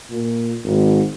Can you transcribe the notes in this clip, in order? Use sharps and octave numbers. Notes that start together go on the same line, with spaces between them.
A#2
G#1